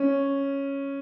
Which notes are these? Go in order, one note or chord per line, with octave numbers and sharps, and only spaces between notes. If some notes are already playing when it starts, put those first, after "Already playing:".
Already playing: C#4